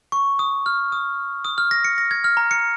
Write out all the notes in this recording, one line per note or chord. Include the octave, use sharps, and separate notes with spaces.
C#6
D#6
F6
D#6
D#6
F6
A#6
C#7
A#6
G#6
F6
A#5
C#7